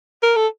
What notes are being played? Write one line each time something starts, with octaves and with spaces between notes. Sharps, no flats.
A#4
A4